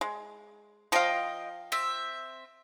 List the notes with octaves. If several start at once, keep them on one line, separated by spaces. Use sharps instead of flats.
G#3
F3 D#5 F5 G5 D#6
C4 E5